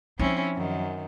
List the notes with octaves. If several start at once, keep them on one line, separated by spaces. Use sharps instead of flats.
F3 C4 C#4 D#4 E4
F#2 D#3